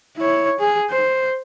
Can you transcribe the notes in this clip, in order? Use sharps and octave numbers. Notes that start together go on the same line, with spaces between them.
E4 C#5
G#4
C5